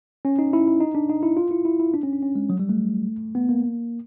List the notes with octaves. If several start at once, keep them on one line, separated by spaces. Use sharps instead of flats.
C#4
D#4
E4
E4
D#4
D4
D#4
E4
F4
E4
E4
E4
D4
C#4
D4
C#4
G#3
F#3
G3
A3
B3
A#3